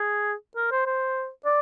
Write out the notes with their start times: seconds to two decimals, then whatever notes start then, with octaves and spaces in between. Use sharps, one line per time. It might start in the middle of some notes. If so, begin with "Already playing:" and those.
Already playing: G#4
0.56 A#4
0.72 C5
0.86 C5
1.46 D5